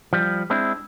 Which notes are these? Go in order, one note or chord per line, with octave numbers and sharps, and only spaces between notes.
F3 G3
G#3 C4 D4 E4